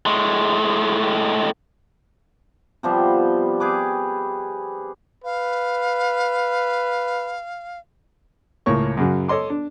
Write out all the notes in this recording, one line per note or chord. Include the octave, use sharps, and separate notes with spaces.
A2 G#3
C3 F3 G3 B3
G4 G#4 B4 D6
B4 F5
C#2 A2 A#3 C#5 C#6
F#2 C#3 F#3
A4 C#5 D#5 C6 D6
D4